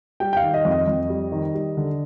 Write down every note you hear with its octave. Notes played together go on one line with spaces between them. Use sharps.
G3 G5
G5
F5
D#3
D#5
F2
D#5
F2
G3
D#3
G3
D3